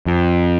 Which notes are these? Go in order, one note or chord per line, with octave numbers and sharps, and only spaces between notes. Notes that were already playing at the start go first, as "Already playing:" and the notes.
F2